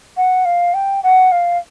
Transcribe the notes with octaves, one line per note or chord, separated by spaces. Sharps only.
F#5
F5
G5
F#5
F5